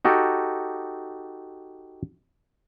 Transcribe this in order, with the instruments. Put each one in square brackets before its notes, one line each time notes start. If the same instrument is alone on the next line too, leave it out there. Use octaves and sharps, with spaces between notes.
[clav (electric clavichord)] D#4 F#4 G4 A4